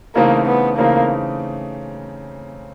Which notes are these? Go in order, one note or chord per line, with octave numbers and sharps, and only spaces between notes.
C#3 E3 A3 A#3 C4 D#4
B3
C#3 E3 A3 A#3 C4 D#4